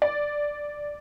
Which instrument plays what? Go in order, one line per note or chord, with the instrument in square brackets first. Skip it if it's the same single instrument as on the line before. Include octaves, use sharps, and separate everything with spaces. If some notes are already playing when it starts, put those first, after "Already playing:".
[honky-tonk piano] D5